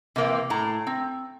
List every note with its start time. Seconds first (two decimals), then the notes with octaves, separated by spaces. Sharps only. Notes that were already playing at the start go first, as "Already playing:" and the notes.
0.16 C3 E3 A#3
0.50 A2 A#5
0.87 C4